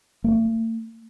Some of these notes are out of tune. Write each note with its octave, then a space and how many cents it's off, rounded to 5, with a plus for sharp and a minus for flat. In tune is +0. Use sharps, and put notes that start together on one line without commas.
A3 +45